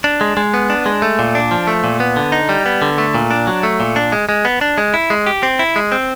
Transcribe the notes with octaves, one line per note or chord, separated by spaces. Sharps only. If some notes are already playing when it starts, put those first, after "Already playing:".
D4
G#3
G#3
B3
D4
G#3
A3
A#2
D4
F3
A3
A#2
B3
D3
D#4
G3
B3
D3
A3
A#2
D4
F#3
A3
A#2
D4
G#3
G#3
B3
D4
G#3
E4
G#3
G4
C4
E4
G#3
C4